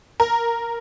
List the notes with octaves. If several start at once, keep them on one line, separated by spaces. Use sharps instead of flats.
A#4